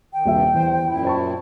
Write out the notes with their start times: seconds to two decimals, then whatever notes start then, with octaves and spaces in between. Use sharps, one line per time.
0.13 D#3 G5
0.25 D#1 G2 C3 E5
0.54 E2 C5
0.87 F#2 A#2 E4
1.05 C5 A5 C#6